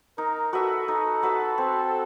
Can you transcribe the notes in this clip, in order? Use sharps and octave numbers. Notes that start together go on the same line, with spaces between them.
D#4 A#4
F#4 A4 B4 E5
D#4 A4
F#4 B4 E5
C4